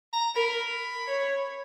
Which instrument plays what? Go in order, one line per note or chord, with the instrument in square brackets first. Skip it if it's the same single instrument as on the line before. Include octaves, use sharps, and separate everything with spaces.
[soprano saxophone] A#5
[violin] A#4 [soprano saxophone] B5
[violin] C#5